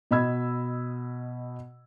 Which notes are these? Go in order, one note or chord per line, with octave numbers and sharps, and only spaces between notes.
B2 D#5 B5 E6 G#6